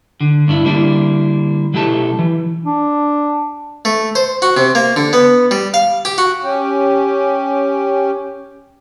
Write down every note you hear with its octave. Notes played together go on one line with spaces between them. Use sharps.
D3
G2 D4 E4
D3 G3 A#3 D4 E4
B2 F#3 A3 E4 G4 A5
E3
D4
A3
C5
F#4
C3
A#3
D3
B3
G3
F5
G4
F#4
C#4 G4